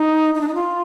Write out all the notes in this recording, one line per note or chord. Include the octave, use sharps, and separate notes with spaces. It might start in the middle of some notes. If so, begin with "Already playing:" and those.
Already playing: D#4
D#4
D4
D#4
F4